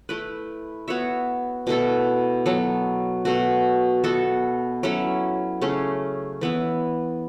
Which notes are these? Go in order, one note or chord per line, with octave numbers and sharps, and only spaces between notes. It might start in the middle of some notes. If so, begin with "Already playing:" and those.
A3 E4 B4
B3 F#4 C#5 E5
B2 A3 E4 A4
F#3 B3 A4
B2 A3 F#4
B3 F#4 A4 E5
F#3 C#4 E4 A4
C#3 A3 C#4
E3 B3 E4